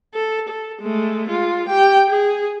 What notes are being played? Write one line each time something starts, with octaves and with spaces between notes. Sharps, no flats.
A4
A4
G#3 A3
G#3 F4
G4 G5
G#4